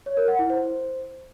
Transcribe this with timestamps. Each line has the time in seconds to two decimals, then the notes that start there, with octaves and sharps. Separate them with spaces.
0.06 C#5
0.17 A#4
0.28 F#5
0.39 E4
0.50 C5